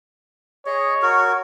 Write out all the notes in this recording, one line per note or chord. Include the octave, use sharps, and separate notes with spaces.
G#4 C#5 D#5
F#4 A#4